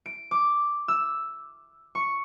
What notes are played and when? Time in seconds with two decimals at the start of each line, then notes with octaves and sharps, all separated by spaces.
0.06 D7
0.31 D6
0.88 E6
1.95 C#6